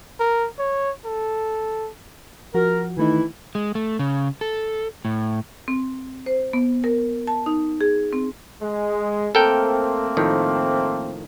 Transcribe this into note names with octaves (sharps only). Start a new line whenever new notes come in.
A#4
C#5
A4
F3 F#4 A#4
D#3 E3 A3 D#4 E4
G#3
A3
C#3
A4
A2
C4
C5
B3
A#4
A5
D#4
G#4
C4
G#3
A3 A#3 C4 A4 A#4 G5
A2 D#3 F3